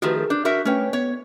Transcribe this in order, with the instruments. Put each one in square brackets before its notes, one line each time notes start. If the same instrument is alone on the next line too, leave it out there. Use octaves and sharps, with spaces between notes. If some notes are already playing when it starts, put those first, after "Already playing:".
[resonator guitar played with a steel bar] D#3 F3 A3 [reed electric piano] F#4 G4 B4
[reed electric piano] G#4 A#4
[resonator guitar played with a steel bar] D4 [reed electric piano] G6
[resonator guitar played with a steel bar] F#4 A#4 E5
[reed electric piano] A3 B4 G5 [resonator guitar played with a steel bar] C#4 C#5
[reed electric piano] B3 [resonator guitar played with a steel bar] C#5